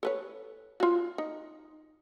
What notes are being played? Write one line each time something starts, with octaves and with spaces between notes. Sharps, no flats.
A4 B4 C#5
F4 F#4
D#4